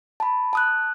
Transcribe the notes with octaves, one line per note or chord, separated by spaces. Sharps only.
A5 B5
A5 D#6 F#6